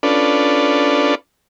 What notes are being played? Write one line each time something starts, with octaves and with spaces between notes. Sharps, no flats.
C#4 D4 F4 A4 B4 D5